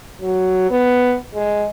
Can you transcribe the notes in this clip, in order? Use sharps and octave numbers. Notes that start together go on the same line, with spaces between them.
F#3
B3
G#3